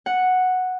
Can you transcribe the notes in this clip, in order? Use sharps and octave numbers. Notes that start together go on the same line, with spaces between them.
F#5